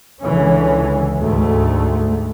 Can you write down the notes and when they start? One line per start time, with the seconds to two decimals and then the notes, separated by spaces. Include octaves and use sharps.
0.22 C#2 D3 E3 C#4
1.20 D2 G#2 A3